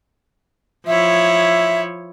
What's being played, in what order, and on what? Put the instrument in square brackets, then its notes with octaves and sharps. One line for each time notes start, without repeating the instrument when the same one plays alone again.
[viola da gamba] F3 E4 C#5 [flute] E5